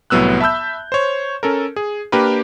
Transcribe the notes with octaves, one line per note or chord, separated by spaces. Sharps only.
C2 A2 F#3 B3 E6 F#6
E5 A5 B5 E6 G6
C5 C#5
C#4 A4 A#4
G#4
A#3 D4 G4 A#4 B4